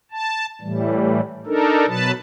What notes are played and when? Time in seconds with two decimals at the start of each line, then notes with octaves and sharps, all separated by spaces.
0.12 A5
0.62 A2 E3 G3
1.46 D4 D#4 A4 A#4
1.87 B2 F#3 B4 A5